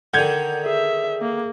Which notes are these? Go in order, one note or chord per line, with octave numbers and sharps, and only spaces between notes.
D3 D#3 F#5 G6 G#6
G#4 E5
A#3